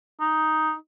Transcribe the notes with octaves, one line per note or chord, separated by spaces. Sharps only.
D#4